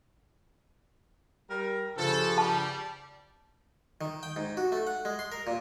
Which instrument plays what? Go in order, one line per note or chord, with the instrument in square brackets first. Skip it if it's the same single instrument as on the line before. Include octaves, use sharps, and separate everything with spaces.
[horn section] G3 A#4
[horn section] G2 F3 [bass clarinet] C#3 [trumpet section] A4
[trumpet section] G3 [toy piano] A5
[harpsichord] D#3
G5
G#2
F#4
A3
F#5
G#3
C6
A#4
A#2